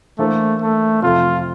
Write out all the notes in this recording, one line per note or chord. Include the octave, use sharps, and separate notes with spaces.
E3 A3 A#3 D4 A4 C5
A3
F2 C3 F3 A3 F4